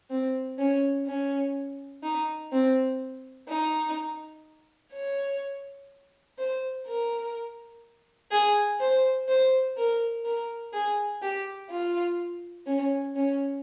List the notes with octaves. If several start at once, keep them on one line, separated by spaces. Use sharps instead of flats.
C4
C#4
C#4
D#4
C4
D#4
C#5
C5
A#4
G#4
C5
C5
A#4
A#4
G#4
G4
F4
C#4
C#4